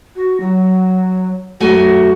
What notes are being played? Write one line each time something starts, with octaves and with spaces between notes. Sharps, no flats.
F#4
F#3
F#2 A3 F#4 G#5